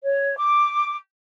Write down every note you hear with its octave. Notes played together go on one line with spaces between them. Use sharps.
C#5
D6